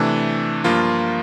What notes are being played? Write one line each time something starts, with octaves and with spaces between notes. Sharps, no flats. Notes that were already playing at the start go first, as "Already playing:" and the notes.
Already playing: C3 E3 A3 D4
G2 F3 A#3 F4